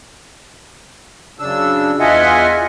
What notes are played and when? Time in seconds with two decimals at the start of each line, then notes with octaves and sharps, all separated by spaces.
1.39 F#2 C#3 D4 E6
1.99 E2 F4 D#5 E5 F#5 G#5